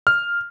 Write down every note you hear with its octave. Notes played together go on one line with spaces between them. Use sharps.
F6